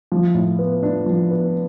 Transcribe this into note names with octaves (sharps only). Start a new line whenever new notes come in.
F3
A2
B3
D4
F3
B3